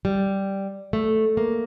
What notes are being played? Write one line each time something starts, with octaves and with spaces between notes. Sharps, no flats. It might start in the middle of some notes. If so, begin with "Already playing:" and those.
G3
A3
A#3